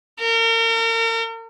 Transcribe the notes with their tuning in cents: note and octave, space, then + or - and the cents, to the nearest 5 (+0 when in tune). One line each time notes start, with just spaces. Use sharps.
A#4 -35